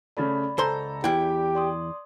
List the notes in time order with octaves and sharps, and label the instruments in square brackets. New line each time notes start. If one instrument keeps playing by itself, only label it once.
[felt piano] C#3 A3 [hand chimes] D5 B5 A6
[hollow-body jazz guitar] C#2 C5 C6 [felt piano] A4 A#5
[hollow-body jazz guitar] E2 E4 [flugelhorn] G4 [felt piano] G5
[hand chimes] D5 C6 D#6